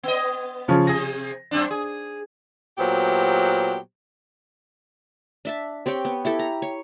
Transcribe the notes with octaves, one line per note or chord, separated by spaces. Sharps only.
B3 D#5
C#3 F3 C#4
C3 G#4 A#6
F#2 C4 D4
G#4
A#2 F#3 B3 G4 C5
D4 E5 A5
C4 G4 C#5 G5
B3
E4 G4 A4
A#5
C#5